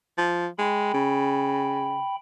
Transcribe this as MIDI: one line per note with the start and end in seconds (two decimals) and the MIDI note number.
0.18 0.47 53
0.59 0.93 56
0.59 2.16 79
0.59 2.16 83
0.94 2.02 49